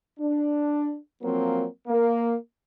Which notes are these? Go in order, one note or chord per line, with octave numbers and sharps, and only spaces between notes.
D4
F3 F#3 A#3 C4
A#3